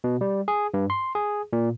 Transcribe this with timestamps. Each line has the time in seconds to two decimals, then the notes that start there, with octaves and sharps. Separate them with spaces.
0.04 B2
0.21 G3
0.48 G#4
0.74 G2
0.90 C6
1.15 G#4
1.53 A#2